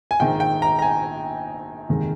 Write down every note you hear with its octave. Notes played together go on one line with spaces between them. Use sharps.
G#5
A#1 G#2 D#3 G5
G5
A#5
A#5
G#5
F1 D#2 D#3 G#3